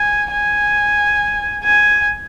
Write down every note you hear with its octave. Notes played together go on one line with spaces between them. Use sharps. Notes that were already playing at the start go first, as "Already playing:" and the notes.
Already playing: G#5
G#5
G#5